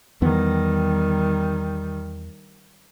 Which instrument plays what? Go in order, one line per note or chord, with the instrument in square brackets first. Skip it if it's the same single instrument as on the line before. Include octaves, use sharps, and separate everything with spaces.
[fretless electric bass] E2 B3 [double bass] D#3 G3